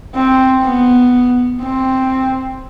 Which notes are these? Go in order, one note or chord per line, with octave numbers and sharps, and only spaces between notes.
C4
B3
C4